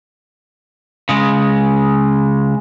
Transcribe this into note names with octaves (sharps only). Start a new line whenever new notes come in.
C#3 G#3